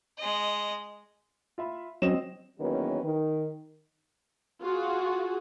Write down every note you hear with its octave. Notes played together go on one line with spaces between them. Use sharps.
G#3 D#5
F4 E5 B5
F#3 C4 C#4 D#5 E7
E2 D#3 F#3 A#3 C#4 B4
D#3
F4 F#4 G#4